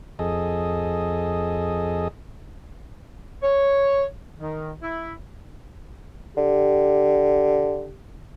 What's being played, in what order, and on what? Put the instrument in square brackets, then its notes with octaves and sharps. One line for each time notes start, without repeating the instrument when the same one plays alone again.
[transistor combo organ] F2 G#4 A4 D#5
[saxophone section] C#5
D#3
E4
[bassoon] D3 [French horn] G4